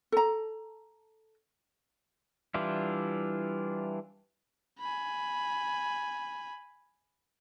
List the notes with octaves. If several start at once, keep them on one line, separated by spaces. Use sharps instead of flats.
A4 A#5
E3 G3 D4 E4 F4
G#5 B5